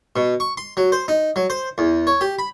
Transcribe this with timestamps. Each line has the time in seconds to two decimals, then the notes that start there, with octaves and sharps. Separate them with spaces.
0.16 B2
0.40 C#6
0.57 C6
0.77 F#3
0.92 C5
1.08 D#4
1.36 F#3
1.50 C5
1.78 E2
2.07 C#5
2.21 G4
2.39 B5